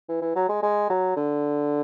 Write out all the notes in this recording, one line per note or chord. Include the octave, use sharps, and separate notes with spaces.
E3
E3
F#3
G#3
G#3
F#3
D3